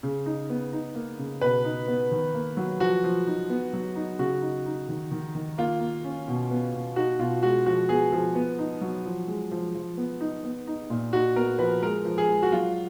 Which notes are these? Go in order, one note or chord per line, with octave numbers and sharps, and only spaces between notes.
C#3
D#4
B3
D#4
A#3
C#3
B2 B4
D#4
B3
D#3
A#3
F#3
F3 F#4
F3
D#4
B3
F#3
D#4
C#3 F#4
D#4
D#4
D#3
D#3
D#3
A#3 F4
A#3
C#4
B2
B3
B2
D#4 F#4
B2 F4
G#3 F#4
F3 F#4
B3 G#4
F3 G#4
B3
D#4
F#3
F3
G#3
F3
F3
B3
D#4
B3
D#4
A#2
D#4 F#4
B3 A#4
F3 B4
G#3 A#4
F3
G#4
G#3
F#4
F#3 F4